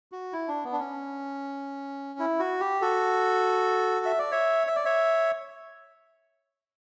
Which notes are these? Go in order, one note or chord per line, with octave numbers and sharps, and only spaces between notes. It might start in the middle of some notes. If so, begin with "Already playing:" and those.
F#4
E4
D4
B3
D4
C#4
E4
F#4
G4
F#4 A4
E5
D5
C#5 E5
E5
D5
C#5 E5